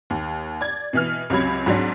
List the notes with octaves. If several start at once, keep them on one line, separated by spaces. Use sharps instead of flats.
D#2
D5 G#6
B2 E3 F6
C#2 C3 F#3 B5 G#6
G#2 F#3 C4 D4